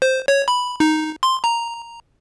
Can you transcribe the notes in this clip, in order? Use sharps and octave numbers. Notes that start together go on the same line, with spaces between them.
C5
C#5
B5
D#4
C6
A#5